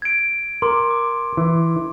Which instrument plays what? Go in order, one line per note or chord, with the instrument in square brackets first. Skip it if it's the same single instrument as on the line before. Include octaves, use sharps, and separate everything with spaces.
[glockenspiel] G#6 D7
[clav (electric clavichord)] A#4 [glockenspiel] C6 D6
[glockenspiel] D6
[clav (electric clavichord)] E3